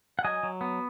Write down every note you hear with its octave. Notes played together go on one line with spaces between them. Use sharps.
F#5
F#3 D#5 G#5
F#3
B3